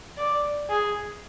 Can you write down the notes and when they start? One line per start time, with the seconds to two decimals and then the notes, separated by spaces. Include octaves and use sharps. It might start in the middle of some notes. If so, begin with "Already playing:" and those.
0.18 D5
0.69 G#4